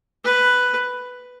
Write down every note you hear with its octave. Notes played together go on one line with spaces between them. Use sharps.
B4